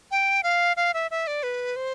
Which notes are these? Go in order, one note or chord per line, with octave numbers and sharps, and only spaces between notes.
G5
F5
F5
E5
E5
D5
B4
C5